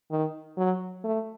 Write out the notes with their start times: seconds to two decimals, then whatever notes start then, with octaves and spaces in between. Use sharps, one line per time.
0.11 D#3
0.57 F#3
1.04 A3